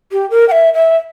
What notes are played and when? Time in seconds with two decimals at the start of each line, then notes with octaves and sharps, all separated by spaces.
0.12 G4
0.30 A#4
0.48 G5
0.51 E5
0.74 E5